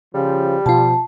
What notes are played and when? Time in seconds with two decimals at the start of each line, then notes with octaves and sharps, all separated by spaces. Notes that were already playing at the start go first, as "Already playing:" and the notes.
0.15 C#3 F3 G3
0.66 B2 F3 F4 A5